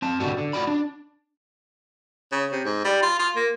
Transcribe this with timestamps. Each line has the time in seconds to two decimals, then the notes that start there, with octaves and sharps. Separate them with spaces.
0.02 C4 A5
0.20 C#2 G#2 D3 G3 B3 F#4
0.38 D3
0.53 A2 A3 F4 F#4 D5 B5
0.67 D4
2.32 C#3
2.52 C3
2.65 G#2
2.84 G3
3.03 F4
3.19 F4
3.36 A#3